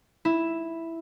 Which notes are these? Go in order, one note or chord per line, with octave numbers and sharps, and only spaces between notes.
E4